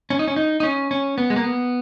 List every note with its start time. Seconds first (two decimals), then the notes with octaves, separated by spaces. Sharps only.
0.10 C#4
0.19 D#4
0.28 C#4
0.36 D#4
0.60 D#4
0.63 C#4
0.91 C#4
1.18 B3
1.30 G#3
1.36 A#3
1.44 B3